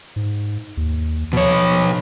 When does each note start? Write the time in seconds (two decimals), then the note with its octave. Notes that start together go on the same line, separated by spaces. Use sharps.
0.16 G#2
0.77 D#2
1.33 B2 F3 C#5